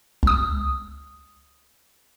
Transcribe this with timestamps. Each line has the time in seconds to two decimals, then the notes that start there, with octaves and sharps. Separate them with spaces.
0.23 C#2 D#6